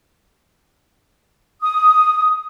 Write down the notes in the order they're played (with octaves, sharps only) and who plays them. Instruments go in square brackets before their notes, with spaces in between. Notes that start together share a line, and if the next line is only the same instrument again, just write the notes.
[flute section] D#6